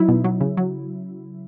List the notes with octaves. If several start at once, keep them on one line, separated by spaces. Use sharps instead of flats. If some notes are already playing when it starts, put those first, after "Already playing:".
Already playing: F#3 D#4 E4
B2
F#3
C#3
F#3